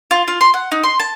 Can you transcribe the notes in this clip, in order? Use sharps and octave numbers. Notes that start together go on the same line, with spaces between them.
F4
F4
C6
F#5
D#4
C6
A5